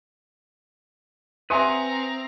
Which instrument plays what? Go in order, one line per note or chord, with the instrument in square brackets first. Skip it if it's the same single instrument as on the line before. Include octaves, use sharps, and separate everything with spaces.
[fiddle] C4 A#5 [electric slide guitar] B4 F#5 G#5 [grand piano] E5 C6 D#6